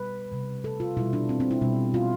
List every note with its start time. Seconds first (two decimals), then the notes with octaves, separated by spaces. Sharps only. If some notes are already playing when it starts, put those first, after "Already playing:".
Already playing: B2 G3 B4
0.32 C3 G3
0.64 A4
0.80 F4
0.97 B2 G3 E4
1.13 D4
1.29 C4
1.40 C4
1.51 E4
1.62 B2 G3
1.94 F4